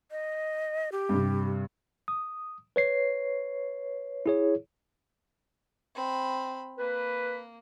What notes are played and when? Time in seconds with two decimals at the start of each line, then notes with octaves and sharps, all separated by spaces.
0.11 D#5
0.92 G4
1.09 G2 C3
2.08 D#6
2.76 B4 C#5 C7
4.26 E4 G#4 C#5
5.95 C4 B5
6.78 A#3 B4